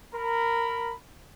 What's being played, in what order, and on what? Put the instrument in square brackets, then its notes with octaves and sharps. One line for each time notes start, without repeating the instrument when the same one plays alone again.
[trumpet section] A#4 B5